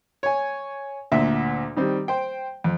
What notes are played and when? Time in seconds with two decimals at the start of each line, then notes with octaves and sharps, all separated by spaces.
0.23 C#5 G#5
1.12 D2 A#2 E5
1.76 D#3 G3 C4
2.08 C5 G5
2.64 F2